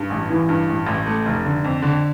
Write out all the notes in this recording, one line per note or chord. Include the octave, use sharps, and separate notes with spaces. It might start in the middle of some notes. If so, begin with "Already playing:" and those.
Already playing: G2
A1
E3
G2
A1
A1
A3
F1
D3
F2
D3